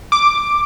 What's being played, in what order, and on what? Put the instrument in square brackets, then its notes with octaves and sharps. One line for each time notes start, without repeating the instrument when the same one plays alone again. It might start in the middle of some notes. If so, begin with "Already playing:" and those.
[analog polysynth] D6